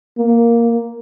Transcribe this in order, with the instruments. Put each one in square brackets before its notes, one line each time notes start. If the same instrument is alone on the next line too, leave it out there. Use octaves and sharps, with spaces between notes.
[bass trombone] A#3